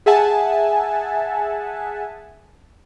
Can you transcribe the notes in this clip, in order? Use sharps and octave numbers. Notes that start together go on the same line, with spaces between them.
G#4 E5 F#5 G#5 A5